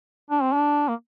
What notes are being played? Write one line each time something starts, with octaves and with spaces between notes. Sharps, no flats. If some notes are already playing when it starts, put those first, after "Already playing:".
D4
C4
D4
A#3